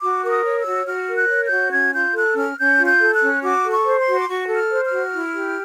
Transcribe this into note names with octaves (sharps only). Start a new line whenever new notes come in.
F#4 D6
A#4 D6
D#6
C#5
E6
F#4
F#4 F6
A#4
F#6
C#5
G6
F#4
C#4 G#6
F4 G6
A4 F#6
C#4 F6
C#4 G6
F4
G6
A4
F#6
C#4
F#4 D6
A4
C#6
C5
C6
F#4
D6
F#4 C#6
A4
F6
C5
F6
F#4
E4
G4